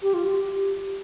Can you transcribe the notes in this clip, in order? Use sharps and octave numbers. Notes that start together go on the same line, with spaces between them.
G4
F4
G4